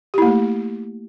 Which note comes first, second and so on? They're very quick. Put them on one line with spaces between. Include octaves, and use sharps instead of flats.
G4 E4 A#3 A3